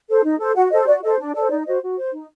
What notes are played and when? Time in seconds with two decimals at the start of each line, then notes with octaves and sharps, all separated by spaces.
0.09 A4 C5
0.24 D#4
0.40 A4 C5
0.56 F#4 F#5
0.71 A4 C5 D#5
0.87 F#4 D5
1.03 A4 C5 D#5
1.19 D4
1.34 A4 C5 D5
1.50 D#4 D5
1.66 F#4 C5 D#5
1.82 F#4
1.97 C5
2.13 D#4